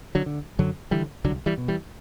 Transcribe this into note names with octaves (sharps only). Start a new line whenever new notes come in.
D3 F#3
D3
F#2 D3 F#3
D3 E3 G3
C2 D3 F#3
E3 G3
B2
E3 G3